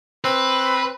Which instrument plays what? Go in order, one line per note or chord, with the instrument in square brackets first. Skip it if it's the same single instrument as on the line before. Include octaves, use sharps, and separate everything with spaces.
[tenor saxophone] C4 [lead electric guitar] B4